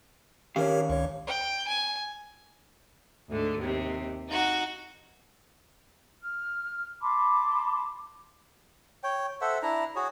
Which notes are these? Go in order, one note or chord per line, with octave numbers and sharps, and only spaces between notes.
D#3 C#4 G4 A#4 C#5 F5
C#2 C#5
G5
G#5
D2 G#2 D3
D#2 C3
D#4 F#4
F6
A5 B5 C6 D6
C#5 G5
A4 C5 E5 F#5
D4 E4 A#5
F#4 G#4 C#5